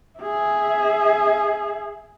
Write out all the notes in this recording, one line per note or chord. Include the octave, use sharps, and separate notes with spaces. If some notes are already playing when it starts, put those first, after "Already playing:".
G#4 E5